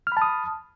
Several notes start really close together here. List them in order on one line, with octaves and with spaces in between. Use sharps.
F6 B5 A5 D#6